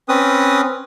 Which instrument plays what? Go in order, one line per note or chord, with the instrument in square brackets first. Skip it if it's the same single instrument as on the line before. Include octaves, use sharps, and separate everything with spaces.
[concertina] C4 C#4 B4 D#6